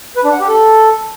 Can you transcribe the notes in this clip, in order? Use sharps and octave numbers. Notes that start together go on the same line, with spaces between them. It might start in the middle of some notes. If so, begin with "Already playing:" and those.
B4
D4
F#5
G4
A4